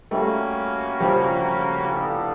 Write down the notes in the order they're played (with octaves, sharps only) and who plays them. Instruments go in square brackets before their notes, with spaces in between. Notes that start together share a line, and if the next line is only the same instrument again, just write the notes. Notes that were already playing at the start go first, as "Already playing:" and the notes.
[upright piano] G3 A3 [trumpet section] A#3 C#4 F#4
[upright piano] F3 G3
[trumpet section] B3 E4 A4 D5 F5